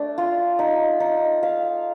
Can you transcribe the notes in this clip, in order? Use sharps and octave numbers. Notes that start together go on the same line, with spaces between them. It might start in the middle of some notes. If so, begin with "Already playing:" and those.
Already playing: A3 D4
F4
D#4
D#4
F5